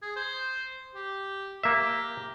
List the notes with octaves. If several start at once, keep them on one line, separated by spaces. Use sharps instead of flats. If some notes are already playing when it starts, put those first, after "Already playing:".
G#4
C5
G4
A#3 G4 E5